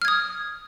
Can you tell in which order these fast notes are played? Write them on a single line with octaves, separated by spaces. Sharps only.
F6 G#6 D#6